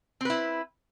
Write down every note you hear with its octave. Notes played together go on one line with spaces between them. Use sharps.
C4 E4 B4